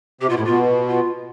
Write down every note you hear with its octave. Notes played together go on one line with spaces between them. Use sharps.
C3 G4
B2 F4
A2 E4
B2 F4
F4